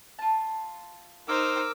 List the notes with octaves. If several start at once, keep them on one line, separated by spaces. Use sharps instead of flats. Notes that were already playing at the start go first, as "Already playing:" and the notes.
F4 A5
D#4 A#4 C5 D6 E6